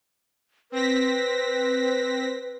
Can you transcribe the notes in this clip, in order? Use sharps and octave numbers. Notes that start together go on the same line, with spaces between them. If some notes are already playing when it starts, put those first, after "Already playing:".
C4 B4 A#6 B6